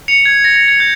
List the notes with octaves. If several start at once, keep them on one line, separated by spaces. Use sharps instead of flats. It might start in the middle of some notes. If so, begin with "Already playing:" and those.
C#7 F7
G#6
A#6
A#6
G#6
G6